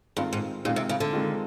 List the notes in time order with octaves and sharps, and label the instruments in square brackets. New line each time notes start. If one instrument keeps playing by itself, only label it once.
[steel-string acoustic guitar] G2 [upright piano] D#3 G#3 C4 F4
[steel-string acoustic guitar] G#2
[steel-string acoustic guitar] A#2 [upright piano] D#3 G#3 C4 F4
[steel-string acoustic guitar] C3
C#3
D3
[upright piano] D#3 G#3 C4 F4